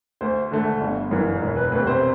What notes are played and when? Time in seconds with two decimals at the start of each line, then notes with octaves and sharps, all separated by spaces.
0.21 D2 C5
0.51 D3 A3
0.81 G1
1.11 F#2 E3
1.41 E1
1.57 B4
1.72 D2 C3 B4
1.87 C5